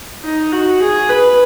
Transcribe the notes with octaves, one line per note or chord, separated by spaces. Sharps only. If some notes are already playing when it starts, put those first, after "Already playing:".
D#4
F#4
G#4
B4